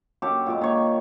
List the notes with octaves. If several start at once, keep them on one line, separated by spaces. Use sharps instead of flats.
F#2 G4 A4 D6
A#2 G#3 D6
D#3 C#5 G5